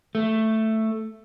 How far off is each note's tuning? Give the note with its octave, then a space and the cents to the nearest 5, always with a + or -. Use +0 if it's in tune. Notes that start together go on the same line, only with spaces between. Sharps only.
A3 +5